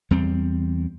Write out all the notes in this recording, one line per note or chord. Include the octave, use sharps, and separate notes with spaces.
E2 G3 C4